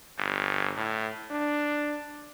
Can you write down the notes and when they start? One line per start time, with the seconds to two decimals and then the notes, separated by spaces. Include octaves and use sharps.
0.18 G1
0.77 A2
1.31 D4